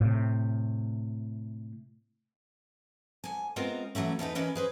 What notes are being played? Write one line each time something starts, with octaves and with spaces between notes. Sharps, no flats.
A2 C3
D2 G#5
G#3 B3 C4 F4 A#4
E3 F#3 A3 C#4
E2 A3 D#4 B4
E3 C#4 A#4 B4 D#5
G#4 B4 C5